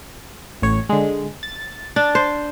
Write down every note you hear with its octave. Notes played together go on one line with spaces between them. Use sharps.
A1 A2 C#5
D3 G#3
A6
D4 A6
C5